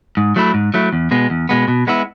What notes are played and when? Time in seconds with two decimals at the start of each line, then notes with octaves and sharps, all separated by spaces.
0.17 G#2
0.36 F#3 A3 E4
0.54 G#2
0.74 F#3 A3 E4
0.93 E2
1.11 B2 G#3 B3
1.30 E2
1.49 B2 G#3 B3
1.68 B2
1.87 G#3 B3 E4